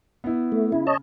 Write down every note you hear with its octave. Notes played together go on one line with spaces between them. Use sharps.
B3 E4
A3
C#3 E4
C#5 D#5 A5